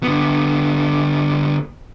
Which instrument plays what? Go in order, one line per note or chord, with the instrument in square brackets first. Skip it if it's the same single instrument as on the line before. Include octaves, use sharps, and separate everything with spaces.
[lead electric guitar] D3 B3